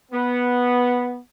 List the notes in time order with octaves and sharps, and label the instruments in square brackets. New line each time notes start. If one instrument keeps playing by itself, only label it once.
[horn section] B3